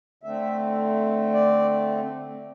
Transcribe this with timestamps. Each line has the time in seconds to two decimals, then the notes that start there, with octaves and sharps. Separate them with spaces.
0.23 D3 A3 C4 E5
1.34 D5